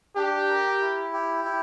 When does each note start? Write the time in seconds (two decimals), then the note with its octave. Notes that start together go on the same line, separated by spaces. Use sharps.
0.16 D4 G4
0.49 A#4
0.81 E4
1.13 G4
1.44 E4